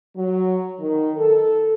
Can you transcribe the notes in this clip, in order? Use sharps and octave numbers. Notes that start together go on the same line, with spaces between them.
F#3
D#3
A4